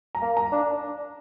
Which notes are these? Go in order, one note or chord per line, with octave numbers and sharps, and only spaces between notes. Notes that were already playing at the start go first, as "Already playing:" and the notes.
A#5
A#3
A#5
D4